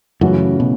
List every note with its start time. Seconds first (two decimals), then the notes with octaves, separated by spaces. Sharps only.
0.21 F#2 C#3 E3 A3 C#4 F#4
0.60 B2